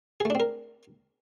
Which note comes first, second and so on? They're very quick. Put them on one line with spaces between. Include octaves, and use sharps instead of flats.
G#4 A3 D4 C4 A#4